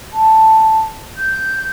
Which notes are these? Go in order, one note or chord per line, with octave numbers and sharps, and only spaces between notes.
A5
G6